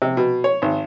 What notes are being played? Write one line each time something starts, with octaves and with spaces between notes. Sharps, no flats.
C3
B2
C#5
G#1